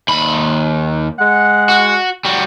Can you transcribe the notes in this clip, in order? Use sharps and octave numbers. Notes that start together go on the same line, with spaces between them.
D#2 B5
G#3 F#5
F#4
G3 F#4